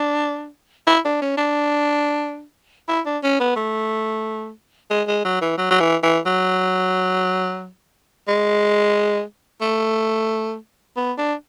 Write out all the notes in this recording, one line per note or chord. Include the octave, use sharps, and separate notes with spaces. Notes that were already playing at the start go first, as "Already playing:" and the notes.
Already playing: D4
E4
D4
C#4
D4
E4
D4
C#4
B3
A3
G#3
G#3
F#3
E3
F#3
F#3
E3
E3
F#3
G#3
A3
B3
D4